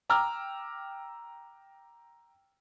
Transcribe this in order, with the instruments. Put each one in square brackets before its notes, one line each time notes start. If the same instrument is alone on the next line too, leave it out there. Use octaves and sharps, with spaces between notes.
[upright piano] G5 A#5 D6 E6 F6